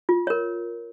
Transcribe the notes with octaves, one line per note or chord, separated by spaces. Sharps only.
F4
A#4 C#5